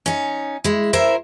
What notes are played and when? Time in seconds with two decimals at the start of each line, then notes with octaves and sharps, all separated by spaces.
0.06 C#4 D#4
0.64 G#3 E4
0.93 E4 A#4 C5 E5